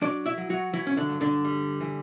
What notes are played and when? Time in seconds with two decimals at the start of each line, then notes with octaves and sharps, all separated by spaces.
0.02 F#3 D4 D5
0.26 E4 E5
0.38 F#3
0.50 F#3 F#4
0.73 E3 F#3 E4
0.87 C#4
0.97 D3 D4
1.10 G2
1.21 D3 D4
1.45 G3
1.80 E3